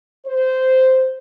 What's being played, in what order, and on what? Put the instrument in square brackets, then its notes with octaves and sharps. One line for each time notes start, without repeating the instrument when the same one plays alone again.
[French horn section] C5